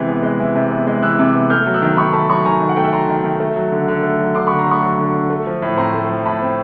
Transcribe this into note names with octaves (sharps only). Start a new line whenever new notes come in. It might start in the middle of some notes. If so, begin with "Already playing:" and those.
Already playing: C3 E3 G#3
B3
G#3
E3
C3
B3
G#3
E3 E6 F#6
C3
B3
A3 F6 G6
F#3
E6 F#6
D#3
D#3 B5 C#6
A3 A5 B5
F#3 B5 C#6
D#3 G#5 A#5
D#3
F#5
A3 G5
E5 F#5
F#3 A#5 C6
D#3
D#3
A3
F#3
D3
D3
A3
F#3
D3 C6 D6
B5 C#6
D3
A#5 C6
A3
B5 C#6
F#3
D3
D3
A3
F3
A2
C4 A#5 C6
A3
F3
A2 A5 B5
C4